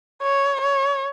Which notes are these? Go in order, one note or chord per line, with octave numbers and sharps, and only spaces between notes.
C#5
C#5